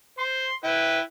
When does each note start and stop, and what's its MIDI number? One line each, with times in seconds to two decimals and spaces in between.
0.18 0.46 72
0.18 0.56 84
0.64 1.00 64
0.64 1.00 71
0.64 1.00 79